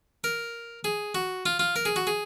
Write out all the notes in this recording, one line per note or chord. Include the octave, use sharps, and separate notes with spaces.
A#4
G#4
F#4
F4
F4
A#4
G#4
F#4
G#4